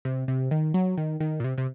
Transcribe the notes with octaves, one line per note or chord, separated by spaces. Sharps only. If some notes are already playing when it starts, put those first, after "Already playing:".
C3
C3
D#3
F#3
D#3
D#3
A#2
C3
C3